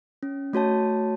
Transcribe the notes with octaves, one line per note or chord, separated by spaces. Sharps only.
C#4
A3 F#4 C#5 A5